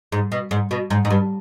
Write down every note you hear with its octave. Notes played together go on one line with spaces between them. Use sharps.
G#2
B2
G#2
B2
G#2
G#2
G2